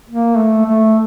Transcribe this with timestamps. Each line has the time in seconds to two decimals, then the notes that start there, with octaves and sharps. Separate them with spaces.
0.10 A#3
0.38 A3
0.66 A3